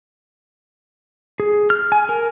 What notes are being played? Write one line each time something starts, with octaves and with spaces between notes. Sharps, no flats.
G#4
F6
G#5
A#4